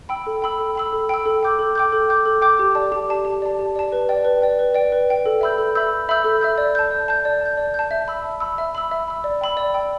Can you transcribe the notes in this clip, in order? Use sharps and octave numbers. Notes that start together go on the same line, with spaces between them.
G5 B5 E6
A4
G5 B5 E6
A4
G5 B5 E6
A4
G5 B5 E6
A4
G5 D6 G6
A4
G5 D6 G6
A4
G5 D6 G6
A4
G5 D6 G6
G4
D5 A5
G4
D5 A5
G4
D5 A5
G4
D5 A5
B4
D5 G5
B4
D5 G5
B4
D5 G5
B4
D5 G5
A4
E5 B5 E6 G6
A4
E5 B5 E6 G6
A4
E5 B5 E6 G6
A4
E5 B5 E6 G6
D5
A5 G6
D5
A5 G6
D5
A5 G6
D5
A5 G6
E5
B5 E6
E5
B5 E6
E5
B5 E6
E5
B5 E6
D5
G5 B5 E6
D5
G5 B5 E6